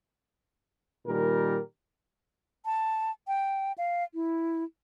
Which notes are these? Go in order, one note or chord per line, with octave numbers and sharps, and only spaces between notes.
A#2 D#3 G3 A#4
A5
G5
F5
E4